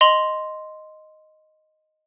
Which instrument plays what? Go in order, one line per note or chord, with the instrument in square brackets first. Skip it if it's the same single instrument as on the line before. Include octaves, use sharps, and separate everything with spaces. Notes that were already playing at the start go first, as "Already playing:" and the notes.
[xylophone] D#5 C6 F7 F#7